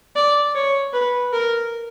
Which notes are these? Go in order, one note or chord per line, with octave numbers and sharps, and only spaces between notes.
D5
C#5
B4
A#4